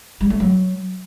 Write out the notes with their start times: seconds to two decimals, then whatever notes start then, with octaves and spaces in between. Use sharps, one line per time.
0.21 G3
0.30 A3
0.40 F#3